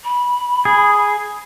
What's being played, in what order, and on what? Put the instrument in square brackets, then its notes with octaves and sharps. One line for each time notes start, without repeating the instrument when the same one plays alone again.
[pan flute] B5
[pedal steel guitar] G#4